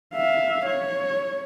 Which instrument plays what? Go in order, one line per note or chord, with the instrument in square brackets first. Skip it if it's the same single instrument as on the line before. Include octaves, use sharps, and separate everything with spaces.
[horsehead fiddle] E5 F5
C#5